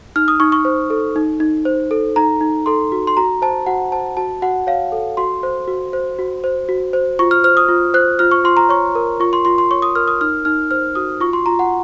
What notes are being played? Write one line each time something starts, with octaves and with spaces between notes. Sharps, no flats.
D#4 F6
D#6
D#4 C#6
C#6
C5
A4
D#4
D#4
C5
A4
D#4 A#5
D#4
A4 C6
F#4
C6
F#4 A#5
C5 A5
F#4 F#5
C5 A5
F#4 A5
F#4 F#5
C#5 F5
A4
F#4 C6
C5
F#4
C5
F#4
C5
F#4
C5
F4 C#6
F6
C5 F6
D#6
F4
C5 F#6
F4 F6
C#6
F4 C6
A#5
C#5 C#6
A#4
F4 C#6
C6
F4 C6
C6
C#5 C#6
D#6
A#4 F6
D#6
D#4 F6
D#4 F6
C5 F6
F#4 D#6
F4 C#6
C6
F4 A#5
F#5